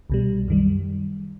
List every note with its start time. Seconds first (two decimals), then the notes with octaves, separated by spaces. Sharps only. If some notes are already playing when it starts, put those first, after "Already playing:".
0.10 C2 B2 G3
0.48 F#2 D#3 G3